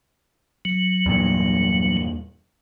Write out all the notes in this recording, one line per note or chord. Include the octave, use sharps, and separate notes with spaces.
F#3
E2 G2 A#2